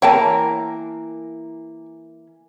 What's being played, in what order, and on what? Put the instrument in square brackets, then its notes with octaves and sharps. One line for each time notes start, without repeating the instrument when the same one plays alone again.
[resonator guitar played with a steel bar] E3 A#3 A#4 [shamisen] C#5 G5 A5